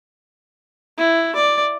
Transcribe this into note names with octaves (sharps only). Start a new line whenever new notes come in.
E4
D5